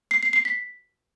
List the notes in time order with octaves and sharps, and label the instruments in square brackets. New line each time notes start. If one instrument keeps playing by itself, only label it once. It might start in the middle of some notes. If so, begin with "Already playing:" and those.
[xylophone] C7
C7
C7
B6